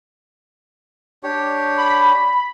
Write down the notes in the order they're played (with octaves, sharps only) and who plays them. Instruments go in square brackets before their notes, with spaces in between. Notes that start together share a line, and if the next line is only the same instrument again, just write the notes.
[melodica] D4 G4 C#5
[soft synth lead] B5